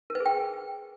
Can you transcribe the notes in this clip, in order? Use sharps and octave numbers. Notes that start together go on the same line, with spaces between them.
A#4
B4
G#4
G5